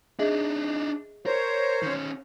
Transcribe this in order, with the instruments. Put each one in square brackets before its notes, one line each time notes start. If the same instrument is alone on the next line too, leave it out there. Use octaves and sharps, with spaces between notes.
[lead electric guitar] D4 D#4 [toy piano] G#4 D#5 E5
[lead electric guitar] A#4 [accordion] C5 C#5
[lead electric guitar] D#3 C#4